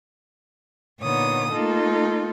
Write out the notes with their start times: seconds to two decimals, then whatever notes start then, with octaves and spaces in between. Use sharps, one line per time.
1.00 A#2 D3 B3 D#4 C#5 D#6
1.51 A3 A#3 D#4 F4 A4